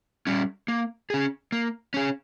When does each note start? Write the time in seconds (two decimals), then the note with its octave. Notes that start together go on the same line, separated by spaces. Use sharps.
0.27 G3 C#4
0.68 A#3
1.10 C#4 G#4
1.52 A#3
1.94 C#4 G#4